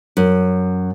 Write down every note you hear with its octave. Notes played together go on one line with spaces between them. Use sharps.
F#2